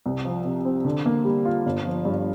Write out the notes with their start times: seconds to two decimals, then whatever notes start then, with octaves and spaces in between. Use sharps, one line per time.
0.06 C2
0.25 F3
0.45 C3
0.65 C4
0.85 D3
1.06 A#3
1.25 G3
1.45 F4
1.66 G1
1.85 F3
2.05 G2